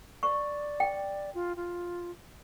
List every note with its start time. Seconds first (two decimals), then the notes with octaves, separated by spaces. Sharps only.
0.23 D5 C#6
0.80 G5
1.35 F4
1.56 F4